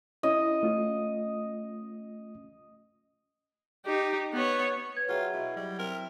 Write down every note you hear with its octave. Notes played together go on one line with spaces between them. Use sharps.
C#4 E4 D#5
A3 C#4 F4
D#4 G4
B3 C#5
B4 C#5 G#6
F#3 F4 G#4 E5 G5
B2 E4
F#3 G3
C4 A#4 E5